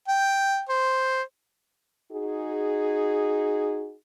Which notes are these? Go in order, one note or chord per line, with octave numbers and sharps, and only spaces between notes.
G5
C5
D#4 F#4 G#4